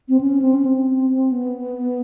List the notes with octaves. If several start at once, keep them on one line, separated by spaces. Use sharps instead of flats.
C4
C#4
C4
C#4
C4
B3